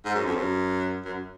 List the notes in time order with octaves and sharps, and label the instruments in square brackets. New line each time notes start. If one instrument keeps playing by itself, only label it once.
[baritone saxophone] G#2
F#2
F2
F#2
F#2